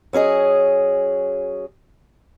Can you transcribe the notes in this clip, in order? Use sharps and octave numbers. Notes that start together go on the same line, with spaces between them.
F#3 C#4 G#4 D#5